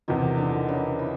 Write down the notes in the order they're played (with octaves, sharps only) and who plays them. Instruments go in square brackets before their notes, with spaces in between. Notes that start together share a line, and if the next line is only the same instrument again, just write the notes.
[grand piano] E2 C3 F3 [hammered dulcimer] D#3
[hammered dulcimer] D3
C#3
E3